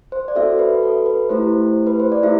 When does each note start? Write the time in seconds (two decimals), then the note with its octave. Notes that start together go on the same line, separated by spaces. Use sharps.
0.12 C5
0.28 D5
0.36 C4 F#4 A4 E5
0.59 B4
0.83 A4
1.06 B4
1.29 A3 E4 G4 C5
1.87 B4
2.00 C5
2.12 D5
2.23 A3 E4 G4 E5